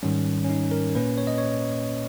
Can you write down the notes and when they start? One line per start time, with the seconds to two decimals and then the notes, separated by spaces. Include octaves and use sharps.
0.03 G#2 D#3 G3 C#4
0.44 C#4
0.50 D#4
0.71 A#4
0.95 A#2 A#3 C#4 B4
1.18 C#5
1.27 D#5
1.38 C#5